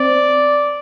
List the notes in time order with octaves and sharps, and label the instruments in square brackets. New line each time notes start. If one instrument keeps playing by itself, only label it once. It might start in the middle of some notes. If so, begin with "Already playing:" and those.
Already playing: [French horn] C4 [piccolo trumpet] D5